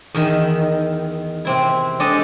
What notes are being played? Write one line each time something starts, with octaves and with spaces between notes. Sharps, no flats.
E2 D#3
C3 C4 E4
G#3 D4 G4 A4 D#5